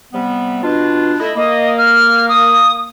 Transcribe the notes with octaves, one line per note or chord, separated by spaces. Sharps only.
C3 G3 B3
B2 D4 F4
A3 E4 D#5
A#3 D#5
F6
D#6